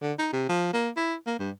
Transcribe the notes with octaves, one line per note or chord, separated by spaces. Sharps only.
D3
D#4
C3
F3
A#3
E4
A#3
G2